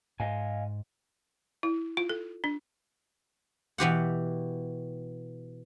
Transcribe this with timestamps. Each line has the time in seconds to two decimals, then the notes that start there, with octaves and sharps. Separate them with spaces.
0.20 G#2 D#5 F5 G#5
1.63 E4
1.97 F4
2.09 A4
2.44 D4
3.78 B2 E3 G4 F#5